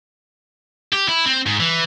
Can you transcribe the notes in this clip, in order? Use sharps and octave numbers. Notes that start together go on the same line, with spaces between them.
G4
E4
C4
G#2
E3